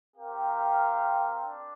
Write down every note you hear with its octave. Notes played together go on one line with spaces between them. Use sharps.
C4 G4 A#4 F5
D4